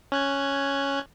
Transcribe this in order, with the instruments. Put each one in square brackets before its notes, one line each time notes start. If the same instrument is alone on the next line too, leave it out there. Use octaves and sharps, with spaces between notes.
[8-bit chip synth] C#4 F#6 G#6